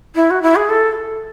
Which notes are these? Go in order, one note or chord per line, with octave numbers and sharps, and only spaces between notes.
E4
F#4
E4
G#4
A4